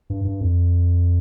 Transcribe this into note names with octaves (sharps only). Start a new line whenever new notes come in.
G2
G2
F2